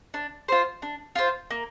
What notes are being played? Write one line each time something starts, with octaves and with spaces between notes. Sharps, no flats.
D4
F4 C5
D4
F4 C5
A#3